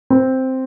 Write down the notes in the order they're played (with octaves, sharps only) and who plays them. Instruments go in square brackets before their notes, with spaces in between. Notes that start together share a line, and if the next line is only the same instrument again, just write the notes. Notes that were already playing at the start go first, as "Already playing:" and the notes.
[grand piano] C4